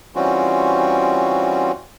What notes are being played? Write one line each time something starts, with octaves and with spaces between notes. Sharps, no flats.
E3 G3 C4 C#4 F4 F#4